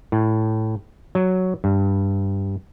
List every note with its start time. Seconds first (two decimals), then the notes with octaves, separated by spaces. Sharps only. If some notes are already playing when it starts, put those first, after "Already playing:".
0.12 A2
1.15 F#3
1.64 G2